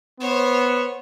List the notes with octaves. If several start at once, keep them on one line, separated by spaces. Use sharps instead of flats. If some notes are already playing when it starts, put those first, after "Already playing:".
B3 C5 C#5